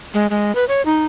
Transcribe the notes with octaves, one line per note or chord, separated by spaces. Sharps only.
G#3
G#3
B4
C#5
D#4